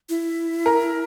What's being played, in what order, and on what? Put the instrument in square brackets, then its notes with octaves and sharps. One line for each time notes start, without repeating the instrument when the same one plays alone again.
[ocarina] E4
[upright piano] A#4